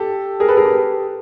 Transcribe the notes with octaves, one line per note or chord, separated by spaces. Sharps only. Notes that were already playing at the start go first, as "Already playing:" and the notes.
Already playing: G4 A4
G#4 A#4
A4 B4
G#4 A#4
G4 A4